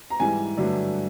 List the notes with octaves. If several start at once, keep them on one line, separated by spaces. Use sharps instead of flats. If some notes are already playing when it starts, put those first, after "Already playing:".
A#5
G#2 E3 G3 G#5
G2 D3 F#3 A3 D4